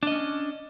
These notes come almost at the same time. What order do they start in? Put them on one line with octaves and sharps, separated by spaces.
D4 D#5 C#4